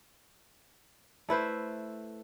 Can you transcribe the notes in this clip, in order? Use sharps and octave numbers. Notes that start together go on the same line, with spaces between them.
A3 E4 B4 C5